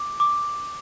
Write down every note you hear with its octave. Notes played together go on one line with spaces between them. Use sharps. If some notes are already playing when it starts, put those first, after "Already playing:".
Already playing: D6
D6